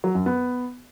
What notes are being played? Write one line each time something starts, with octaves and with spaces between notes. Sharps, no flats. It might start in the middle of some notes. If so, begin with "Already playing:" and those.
F#3
F#2
B3